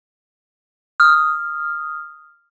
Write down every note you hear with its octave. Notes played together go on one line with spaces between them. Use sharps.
D#6 F6